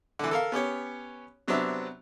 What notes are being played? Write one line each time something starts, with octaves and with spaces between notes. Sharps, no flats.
D3 E3
A4 A#4 F5
B3 C#4 G4 C#5
C3 F#3 B3 C4 D4 E5